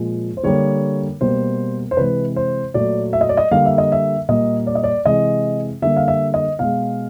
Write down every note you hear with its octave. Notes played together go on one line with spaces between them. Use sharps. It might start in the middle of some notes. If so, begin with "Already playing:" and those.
Already playing: A#2 F3 G#3
C5
D3 G3 A#3 C#5
B2 G3 A#3 C5
C5
C3 E3 G#3 B4
C5
A#2 F#3 A3 D5
E5
D#5
D5
D#5
D3 G3 A#3 F5
E5
D#5
E5
A#2 G3 A#3 D#5
D5
D#5
D5
C3 E3 G#3 D#5
D3 G3 A#3 E5
F5
E5
D#5
B2 G#3 F5